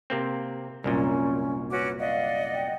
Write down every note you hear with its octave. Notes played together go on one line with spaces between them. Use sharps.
C3 A#3 C4
C2 F#2 A#2 C#4
C#4 F#4 B4 D6
D5 D#5 F5 F#5
G5